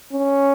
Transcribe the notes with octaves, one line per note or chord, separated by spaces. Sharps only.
C#4